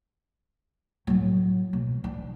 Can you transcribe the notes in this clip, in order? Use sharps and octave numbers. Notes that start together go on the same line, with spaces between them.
A2 F#3
B2
D4